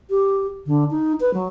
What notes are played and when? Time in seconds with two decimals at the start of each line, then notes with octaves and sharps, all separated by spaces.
0.10 G4
0.66 D3
0.91 D#4
1.20 B4
1.34 F#3